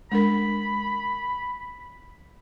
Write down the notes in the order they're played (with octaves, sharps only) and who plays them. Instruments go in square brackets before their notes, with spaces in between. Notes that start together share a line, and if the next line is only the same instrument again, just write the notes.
[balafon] G#3 D4 A#4 [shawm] B5